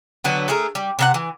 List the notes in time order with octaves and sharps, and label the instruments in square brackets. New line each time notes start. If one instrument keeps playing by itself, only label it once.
[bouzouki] D3 F#3 B3
A3 G#4 A#4
G3
C3 A#4 F#5
E3